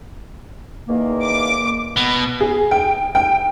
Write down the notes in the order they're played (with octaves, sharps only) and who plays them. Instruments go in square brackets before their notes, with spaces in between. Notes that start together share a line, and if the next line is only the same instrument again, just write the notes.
[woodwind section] E2 D#3 A#3
[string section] D6
[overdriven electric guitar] B2
[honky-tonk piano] G#4
G5
G5